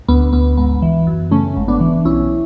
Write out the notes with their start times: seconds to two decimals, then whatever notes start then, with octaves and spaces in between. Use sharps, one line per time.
0.08 D2 B3
0.33 D2 B3
0.57 G#1 B3
0.82 E3
1.07 F#2
1.31 C#3 A3 C#4
1.57 G#1
1.68 B3 D4
1.80 E3
2.05 B1 C#4 E4